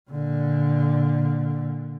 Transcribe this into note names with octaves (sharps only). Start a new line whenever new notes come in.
A#2 D3